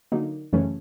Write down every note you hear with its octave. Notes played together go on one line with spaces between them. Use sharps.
D3 F#3 A#3 D#4
F#2 C#3 E3 A3 C#4